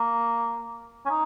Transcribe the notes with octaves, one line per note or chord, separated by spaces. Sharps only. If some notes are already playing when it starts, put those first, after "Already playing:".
Already playing: A#3
C#4
D#4